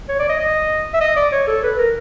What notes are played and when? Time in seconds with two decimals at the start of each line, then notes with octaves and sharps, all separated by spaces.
0.09 C#5
0.19 D5
0.29 D#5
0.39 D#5
0.94 E5
1.01 D#5
1.16 D5
1.32 C#5
1.47 A4
1.63 B4
1.78 A#4